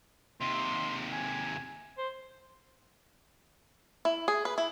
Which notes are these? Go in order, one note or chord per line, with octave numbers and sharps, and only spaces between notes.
D#2 C3 C6
G#5
C5
E4
G#4
B4
E4